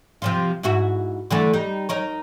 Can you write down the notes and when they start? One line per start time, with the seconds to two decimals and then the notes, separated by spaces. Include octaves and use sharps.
0.22 C3 F3 F4
0.63 G#2 E4 F#4
1.31 D3 E3 A3
1.53 G3 D#4
1.89 D#4 A#4 C#5